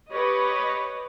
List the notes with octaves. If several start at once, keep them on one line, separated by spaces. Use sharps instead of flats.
G4 B4 C#5 D#5